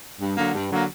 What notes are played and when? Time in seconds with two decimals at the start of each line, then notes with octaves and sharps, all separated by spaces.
0.20 G2
0.37 D3 F#3 A#3
0.54 G2
0.71 D3 F#3 A#3